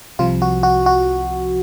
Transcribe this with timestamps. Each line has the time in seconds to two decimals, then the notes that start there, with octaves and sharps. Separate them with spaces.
0.19 C2 C3 F3 F4
0.42 F#4
0.63 F#4
0.86 F#4